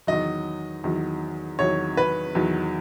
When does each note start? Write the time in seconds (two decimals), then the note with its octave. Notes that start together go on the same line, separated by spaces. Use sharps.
0.07 E2 D#3 F#3 D#5
0.84 E2 D#3 F#3
1.59 E2 D#3 F#3 C#5
1.97 B4
2.35 E2 D#3 F#3